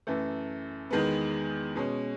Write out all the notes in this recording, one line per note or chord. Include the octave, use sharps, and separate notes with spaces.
F#2 E3 A3
E2 D#3 G#3 B3
B2 G#3 C#4